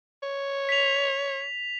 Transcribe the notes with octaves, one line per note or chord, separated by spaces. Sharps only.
C#5
B6 F7